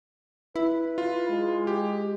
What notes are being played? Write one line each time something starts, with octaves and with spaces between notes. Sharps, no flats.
E4 B4
F4
G#3
G4